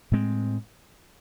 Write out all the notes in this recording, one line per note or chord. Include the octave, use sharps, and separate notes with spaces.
A2 G#3 C4